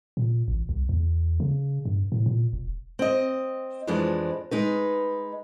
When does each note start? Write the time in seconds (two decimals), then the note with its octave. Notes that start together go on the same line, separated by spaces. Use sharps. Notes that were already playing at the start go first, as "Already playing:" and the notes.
0.17 A#2
0.48 A1
0.69 C2
0.89 E2
1.40 C#3
1.85 G2
2.12 A2
2.26 A#2
2.53 E1
2.99 C4 D#5
3.87 F2 E3 F3 G#3 D4
4.51 G#3 D#4 B4